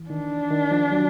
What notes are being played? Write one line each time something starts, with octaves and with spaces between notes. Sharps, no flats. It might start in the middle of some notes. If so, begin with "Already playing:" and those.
Already playing: E3
D#3 D4
D#3
F3
F#3